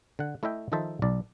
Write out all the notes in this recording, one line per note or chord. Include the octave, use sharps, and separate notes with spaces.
D3 F#5
A3 E4 D#5 E5 G5
D#3 F3 D#4 A4 C5 E5
B1 D5